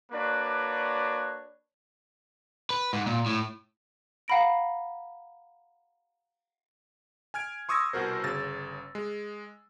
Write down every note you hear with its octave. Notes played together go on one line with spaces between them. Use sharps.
A#3 D4 F#4 B4 C#5 D5
B4
G#2
A#2
A2
F5 F#5 A#5 B5 A#6 D7
G#5 F6 G#6 D7
C6 C#6 D#6 E6 G#6 A#6
C2 B2 F#4 A#4 C5
G1 C#3 A6
G#3